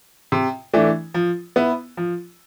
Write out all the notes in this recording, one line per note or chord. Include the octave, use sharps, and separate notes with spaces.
C3
E3 A3 D4
F3
B3 E4
F3